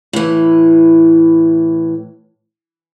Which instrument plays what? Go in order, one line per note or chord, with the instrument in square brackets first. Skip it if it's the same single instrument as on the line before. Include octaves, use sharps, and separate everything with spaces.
[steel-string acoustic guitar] A2 E3